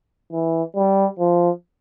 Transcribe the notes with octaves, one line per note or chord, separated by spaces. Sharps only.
E3
G3
F3